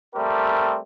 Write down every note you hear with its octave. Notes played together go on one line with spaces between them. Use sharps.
G3 A3 C4 G4 A#4